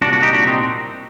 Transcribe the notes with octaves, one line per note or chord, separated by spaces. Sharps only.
C2 A#2 D4 F#4
D4 F#4
D#4 G4
C2 A#2 D4 F#4
C4 D#4